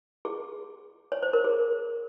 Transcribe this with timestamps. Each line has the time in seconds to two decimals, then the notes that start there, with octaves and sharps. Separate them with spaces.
0.25 G#4
1.12 C#5
1.23 C5
1.33 A#4
1.44 G#4